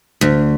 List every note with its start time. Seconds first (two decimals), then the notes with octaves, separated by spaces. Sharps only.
0.21 D2